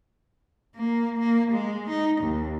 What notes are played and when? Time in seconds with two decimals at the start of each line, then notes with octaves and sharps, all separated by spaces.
0.76 A#3
1.20 A#3
1.51 G#3
1.89 D#4
2.21 D#2